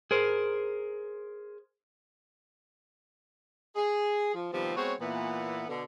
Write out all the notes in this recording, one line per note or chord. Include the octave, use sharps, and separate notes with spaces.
G#4 A#4 C5
G#4
F3
C3 D#3 F3 G3 B3 C4
G#3 B3 C4 F#4 C#5
A#2 E3 B3
B2 D3